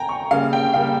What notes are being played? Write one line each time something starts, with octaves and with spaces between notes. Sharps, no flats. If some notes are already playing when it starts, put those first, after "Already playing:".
Already playing: G5 G#5 A#5
C#6
C#3 G3 A#3 F5
G5
C#3 G3 A#3 F5